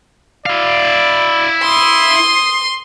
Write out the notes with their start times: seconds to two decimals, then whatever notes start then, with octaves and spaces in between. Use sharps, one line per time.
0.46 E4 D5 F5
1.64 C6 D#6